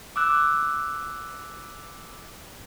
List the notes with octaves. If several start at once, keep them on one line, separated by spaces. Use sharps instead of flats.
D6 E6 F#6